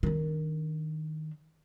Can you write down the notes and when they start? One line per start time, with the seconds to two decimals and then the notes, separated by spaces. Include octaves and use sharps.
0.03 D#3 D4